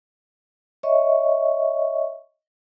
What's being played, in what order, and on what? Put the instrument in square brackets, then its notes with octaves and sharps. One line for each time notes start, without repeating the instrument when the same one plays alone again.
[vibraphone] C#5 D#5 E5 C#6